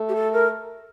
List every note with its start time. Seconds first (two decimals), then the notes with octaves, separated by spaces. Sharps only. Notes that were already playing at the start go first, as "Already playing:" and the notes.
Already playing: A3
0.08 G4
0.15 A4
0.32 A#4